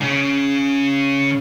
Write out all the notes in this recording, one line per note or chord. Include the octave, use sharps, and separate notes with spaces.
C#3 C#4